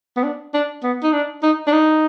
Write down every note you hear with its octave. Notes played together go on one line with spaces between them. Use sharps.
B3
D4
D4
B3
D#4
D4
D#4
D4
D#4